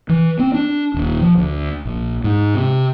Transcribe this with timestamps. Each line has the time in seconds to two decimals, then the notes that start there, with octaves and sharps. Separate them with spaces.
0.09 E3
0.39 C4
0.54 D4
0.94 D#1
1.22 F3
1.37 D2
1.85 A#1
2.24 G#2
2.54 C3